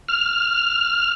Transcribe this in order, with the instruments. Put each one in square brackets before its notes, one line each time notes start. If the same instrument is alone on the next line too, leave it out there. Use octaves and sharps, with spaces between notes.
[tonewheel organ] F6